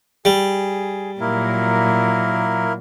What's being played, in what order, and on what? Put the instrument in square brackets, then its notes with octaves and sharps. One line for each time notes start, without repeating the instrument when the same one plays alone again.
[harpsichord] G3 [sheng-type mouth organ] G#4
[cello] A#2 F#3 [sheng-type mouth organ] A#3 E4 A#4